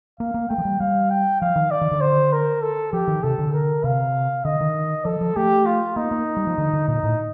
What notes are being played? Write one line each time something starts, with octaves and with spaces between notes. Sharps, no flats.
A#3 F5
A#3
A3 G5
F3
G3
G3 F5
G5
F3 F5
D#3
D5
D#3
D3
C5
A#4
A4
F3 G4
D#3
C3 A4
D3
A#4
C3 F5
D3 D#5
D#3
F3 A4
F3
A3 G4
F4
A#3 D#4
A#3
G3
F3
D3
D3
A#2 D#4
A2